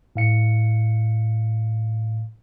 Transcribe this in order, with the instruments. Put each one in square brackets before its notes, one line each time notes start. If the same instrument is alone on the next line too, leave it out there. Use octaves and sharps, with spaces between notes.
[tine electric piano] A2 F5 C#7